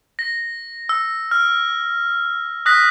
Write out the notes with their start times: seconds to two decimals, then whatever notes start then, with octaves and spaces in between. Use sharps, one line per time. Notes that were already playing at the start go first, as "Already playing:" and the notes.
0.19 A#6
0.89 E6
1.31 F6
2.66 D#6 F#6 A#6 B6